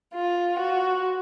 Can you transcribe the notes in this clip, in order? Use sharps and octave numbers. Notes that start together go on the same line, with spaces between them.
F4
F#4